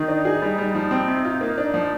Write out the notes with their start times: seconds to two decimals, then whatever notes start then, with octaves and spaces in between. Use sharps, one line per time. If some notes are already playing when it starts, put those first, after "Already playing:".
Already playing: D#3 D#4
0.08 D4
0.25 G#4
0.42 G3
0.58 G3
0.75 F3 D#4
0.91 C4
1.08 C3
1.25 F4
1.41 A#3
1.58 D4
1.74 F3